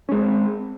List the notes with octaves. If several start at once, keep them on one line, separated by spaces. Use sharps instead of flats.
G#3 C4 C#4